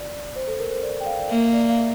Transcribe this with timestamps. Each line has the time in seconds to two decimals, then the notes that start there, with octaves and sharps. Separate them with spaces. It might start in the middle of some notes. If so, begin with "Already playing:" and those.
Already playing: D5
0.36 C5
0.47 A4
0.59 A#4
0.71 C5
0.82 D5
1.00 G5
1.06 F5
1.19 D5
1.29 A#3 E5
1.53 D5
1.69 F5
1.77 E5